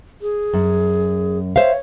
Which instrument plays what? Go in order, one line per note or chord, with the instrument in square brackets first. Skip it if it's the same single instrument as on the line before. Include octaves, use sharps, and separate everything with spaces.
[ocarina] G#4
[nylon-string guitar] F#2
[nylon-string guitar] C5 E5 F5 [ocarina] C#5